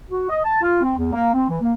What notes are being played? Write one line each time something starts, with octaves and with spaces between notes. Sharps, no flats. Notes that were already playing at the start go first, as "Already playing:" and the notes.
F#4
D#5
A5
F4
C4
E2
A#3
C4
E3
A#3